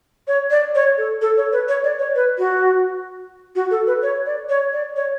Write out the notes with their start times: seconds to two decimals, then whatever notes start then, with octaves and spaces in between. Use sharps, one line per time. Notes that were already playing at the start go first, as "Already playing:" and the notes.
0.27 C#5
0.51 D5
0.75 C#5
0.98 A4
1.21 A4
1.37 C#5
1.52 B4
1.68 C#5
1.84 D5
1.99 C#5
2.15 B4
2.38 F#4
3.55 F#4
3.71 A4
3.87 B4
4.02 C#5
4.26 D5
4.49 C#5
4.73 D5
4.96 C#5